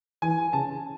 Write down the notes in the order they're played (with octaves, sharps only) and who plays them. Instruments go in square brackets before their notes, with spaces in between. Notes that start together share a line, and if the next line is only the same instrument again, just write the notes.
[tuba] E3 [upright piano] G#5
[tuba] C#3 [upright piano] A5